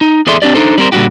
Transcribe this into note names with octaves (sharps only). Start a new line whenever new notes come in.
D#4
E2 G#4 A4 D5 E5 C6
C4 D4 G4 D5
D4 D#4 G4 A4 C5
G3 C4 A#4 C5
A#2 D3 G3 D4 F#4 G4